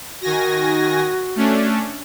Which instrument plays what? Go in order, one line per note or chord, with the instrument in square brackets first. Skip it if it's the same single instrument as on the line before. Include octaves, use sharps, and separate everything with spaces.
[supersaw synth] D#3 G#5 A#6 [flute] F#4
[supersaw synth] A3 C#4 D4